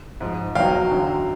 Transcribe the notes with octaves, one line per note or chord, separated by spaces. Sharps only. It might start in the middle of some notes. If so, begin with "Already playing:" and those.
G#2 F3
E2 B2 F#3 F5 G5
F#2 D3 F#3